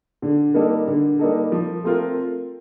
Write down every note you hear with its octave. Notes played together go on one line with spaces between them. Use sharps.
D3
G3 A#3 D#4 A4
D3
G3 A#3 D#4 A4
F3
A3 C4 F4 A#4